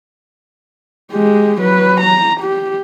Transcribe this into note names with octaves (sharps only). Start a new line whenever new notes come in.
G#3 G4
F#3 B4
A#5
G4